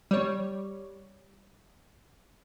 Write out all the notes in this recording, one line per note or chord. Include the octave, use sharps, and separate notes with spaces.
G3 C#5